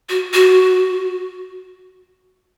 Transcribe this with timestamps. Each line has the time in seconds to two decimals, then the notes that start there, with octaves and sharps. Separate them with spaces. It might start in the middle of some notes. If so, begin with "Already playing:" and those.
0.09 F#4
0.33 F#4